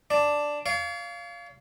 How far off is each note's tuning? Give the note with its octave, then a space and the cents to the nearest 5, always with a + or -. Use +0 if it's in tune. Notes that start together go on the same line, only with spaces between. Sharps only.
D4 +0 D5 +0
C#5 +45 F5 -10